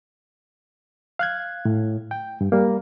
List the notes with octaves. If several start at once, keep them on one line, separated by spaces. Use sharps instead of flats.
F5 F#6 G#6
A2
G5
G2
G3 A#3